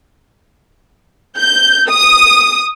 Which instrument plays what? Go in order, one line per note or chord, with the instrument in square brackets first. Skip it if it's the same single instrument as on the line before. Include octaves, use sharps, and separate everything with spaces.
[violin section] G6
D#6